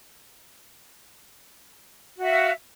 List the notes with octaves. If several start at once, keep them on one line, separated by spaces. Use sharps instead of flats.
F#4 E5 F5